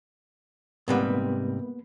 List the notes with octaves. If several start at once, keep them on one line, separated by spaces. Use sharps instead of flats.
G#2 C3 G3 A#3 B3 B4